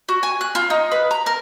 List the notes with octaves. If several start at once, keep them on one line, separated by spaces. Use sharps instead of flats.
F#4
G#5
F#6
F4
D#4
B4
A#5
A#4